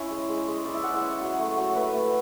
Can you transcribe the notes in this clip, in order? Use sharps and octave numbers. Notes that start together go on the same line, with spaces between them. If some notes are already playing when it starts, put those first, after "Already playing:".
Already playing: C#4 E4
G#3
G#3
G#3
E4 D5
E5
G#3 F#5
D5
C#4 E5
F#3 F#5
A3
F#3
A3 B4
A3